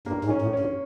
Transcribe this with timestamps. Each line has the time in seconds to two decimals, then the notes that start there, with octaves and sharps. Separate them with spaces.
0.06 G2 A#3
0.25 G#2
0.30 C#4
0.42 A2
0.53 C#4
0.59 G2